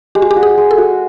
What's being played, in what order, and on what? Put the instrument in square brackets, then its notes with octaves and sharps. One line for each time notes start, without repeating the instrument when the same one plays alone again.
[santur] G#3 [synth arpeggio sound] G4
[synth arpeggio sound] F#4
G4
[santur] F#4
[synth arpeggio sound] G#4
[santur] G#3
[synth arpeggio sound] A4
[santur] F#4